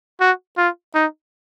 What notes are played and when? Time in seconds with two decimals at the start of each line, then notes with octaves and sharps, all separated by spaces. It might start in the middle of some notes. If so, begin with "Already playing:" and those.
0.20 F#4
0.57 F4
0.94 D#4